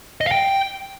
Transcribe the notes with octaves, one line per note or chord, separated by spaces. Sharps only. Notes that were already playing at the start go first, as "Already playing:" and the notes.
D#5
F5
G5